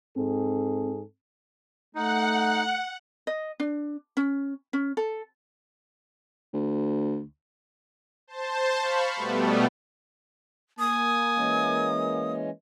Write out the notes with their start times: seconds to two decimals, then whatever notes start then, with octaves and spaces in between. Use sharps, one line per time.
0.16 G#2 C4 G#4 A4
1.95 A3 D#4 F#5
3.27 D#5
3.60 D4
4.17 C#4
4.73 C#4
4.97 A4
6.54 D2
8.27 C5 A5
8.80 F5 B5 C#6
9.16 B2 G3 A3 B3
10.79 A#3 G#5 D#6
11.36 E3 G#3 C#4